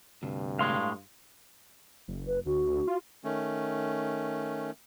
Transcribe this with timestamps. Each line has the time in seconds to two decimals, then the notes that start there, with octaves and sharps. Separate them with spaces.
0.23 D2 G2 C3
0.59 A2 G#3 F5 C6
2.08 F#1
2.27 B4
2.46 D2 F#4
2.87 F4
3.24 D#3 A3 C#4